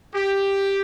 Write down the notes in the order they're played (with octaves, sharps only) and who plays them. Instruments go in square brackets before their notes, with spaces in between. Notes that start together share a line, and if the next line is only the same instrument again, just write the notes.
[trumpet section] G4